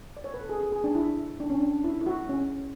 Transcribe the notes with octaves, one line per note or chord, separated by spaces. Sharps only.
D5
C#5
B4
A4
G#4
G#4
G#4
D4
E4
D4
C#4
D4
E4
E4
F#4
C#4